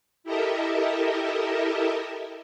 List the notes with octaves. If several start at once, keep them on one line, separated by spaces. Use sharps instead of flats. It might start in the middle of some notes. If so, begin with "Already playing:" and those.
E4 G4 A4 A#4 D#5 E5